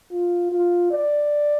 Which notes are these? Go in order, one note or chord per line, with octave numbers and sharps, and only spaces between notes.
F4
F4
D5